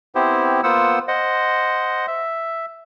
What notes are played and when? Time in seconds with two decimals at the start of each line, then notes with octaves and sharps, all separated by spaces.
0.15 B3 C4 E4 G4 C5
0.63 A#3 B3 F4 C5 F#5 E6
1.08 C5 D#5 F#5
2.07 E5